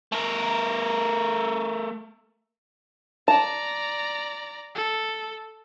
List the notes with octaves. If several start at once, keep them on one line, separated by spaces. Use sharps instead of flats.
A3 A#4
D5 A5 A#5
A4